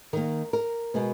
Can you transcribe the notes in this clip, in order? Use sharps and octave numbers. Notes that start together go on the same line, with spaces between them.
D#3 A#3 A#4
A#4
B2 G#3 B3